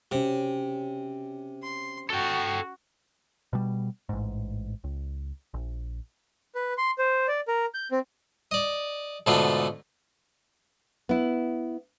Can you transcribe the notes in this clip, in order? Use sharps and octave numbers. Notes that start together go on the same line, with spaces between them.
C3 C#4 F#4
C6
F#4 A4 G5
B2 G3
A1 G#2
C#2
A#1
B4
C6
C5
D5
A#4
G6
C4
D5 D#5
G#2 B2 D3 A3 B3 F4
B3 E4